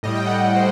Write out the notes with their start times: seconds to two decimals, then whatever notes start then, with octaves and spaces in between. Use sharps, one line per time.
0.03 A2 G3 D#5
0.15 G5
0.26 F#5
0.39 D#5
0.56 C5